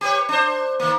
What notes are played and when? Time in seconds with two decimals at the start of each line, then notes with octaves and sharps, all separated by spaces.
0.01 G4 B4 C#5
0.29 D4 C5
0.80 D#3 A#3